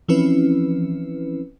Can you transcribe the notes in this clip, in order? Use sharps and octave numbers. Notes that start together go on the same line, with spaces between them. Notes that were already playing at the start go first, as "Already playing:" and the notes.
E3 F3 C4 C#4 E4 B4